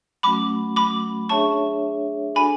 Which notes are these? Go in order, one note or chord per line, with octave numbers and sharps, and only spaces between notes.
F#3 A3 C#4 F#4 B5 D6
B5 D6
D4 G#4 C#5 E5 A5 C#6
D4 F#4 A4 G#5 B5